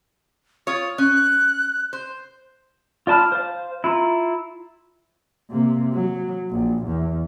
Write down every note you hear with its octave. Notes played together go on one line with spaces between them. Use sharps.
F4 C#5 D#6
C#4 F#6
C5
F4 D5 A5 B5 F6
C5 F5
E4 F4 A#5
C3 A#3
F#3
A#1
E2